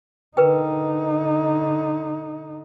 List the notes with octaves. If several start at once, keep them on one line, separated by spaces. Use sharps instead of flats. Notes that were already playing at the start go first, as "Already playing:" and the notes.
D3 D#4 A#4 B4 G5